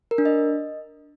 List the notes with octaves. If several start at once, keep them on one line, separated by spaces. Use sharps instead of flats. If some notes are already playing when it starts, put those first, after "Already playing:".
A#4
D4
D#5